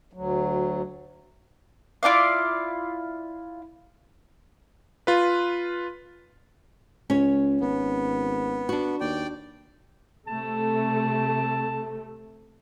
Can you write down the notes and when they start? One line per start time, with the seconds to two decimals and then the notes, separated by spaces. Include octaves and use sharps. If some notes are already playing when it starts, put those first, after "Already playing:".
0.13 D2 F#3
2.03 E4 F4 D5 F5
5.07 F4 B4
7.10 C#2 C#4 C#5
7.61 G#1 B3
8.69 D4 F#4
9.00 D#2 D5 G5
10.27 C3 A3 A5